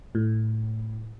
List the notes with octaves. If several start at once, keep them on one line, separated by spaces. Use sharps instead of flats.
A2